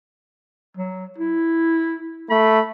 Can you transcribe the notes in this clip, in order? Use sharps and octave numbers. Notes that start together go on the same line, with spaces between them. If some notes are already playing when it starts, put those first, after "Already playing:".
F#3
E4
A3 B5